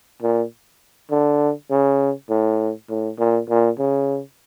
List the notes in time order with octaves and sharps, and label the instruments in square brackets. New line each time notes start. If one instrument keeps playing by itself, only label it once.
[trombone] A#2
D3
C#3
A2
A2
A#2
A#2
C#3